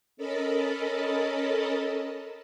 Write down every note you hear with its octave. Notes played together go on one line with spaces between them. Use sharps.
C#4 A4 A#4 D#5 A5 B5